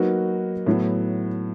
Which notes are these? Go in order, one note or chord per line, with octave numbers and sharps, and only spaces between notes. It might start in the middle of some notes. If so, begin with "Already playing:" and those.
Already playing: F#3 A#3 D#4 F#4 B4
A2 F#3 B3